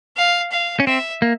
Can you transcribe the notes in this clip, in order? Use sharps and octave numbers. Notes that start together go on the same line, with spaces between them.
F5
F5
C#4
C4 E5
A#3